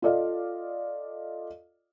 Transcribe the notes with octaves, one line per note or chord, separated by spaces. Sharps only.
F4 A4 D5 D#5 F5